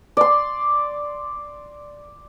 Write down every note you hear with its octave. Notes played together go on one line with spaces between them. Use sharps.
D5 C6